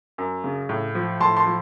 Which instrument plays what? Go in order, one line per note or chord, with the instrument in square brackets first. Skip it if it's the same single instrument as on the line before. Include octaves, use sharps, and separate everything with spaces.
[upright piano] F#2
C#3
A2
F3
A2 A5 C6
A5 C6
F3